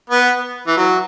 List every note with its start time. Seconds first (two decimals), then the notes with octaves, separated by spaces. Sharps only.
0.10 B3
0.67 E3
0.77 F#3